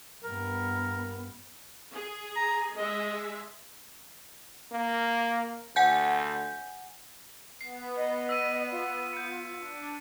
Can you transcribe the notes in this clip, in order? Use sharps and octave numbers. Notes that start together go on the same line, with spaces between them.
G2 B3 A#4
G#4
A#5
G#3 D#5 E5
A#3
D2 F#5 G#5 G6
B3 C7
D#5
E6 B6 D#7
F4
G6 C#7
D4